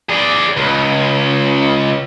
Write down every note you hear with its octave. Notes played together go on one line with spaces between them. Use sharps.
G#4 D5
C#2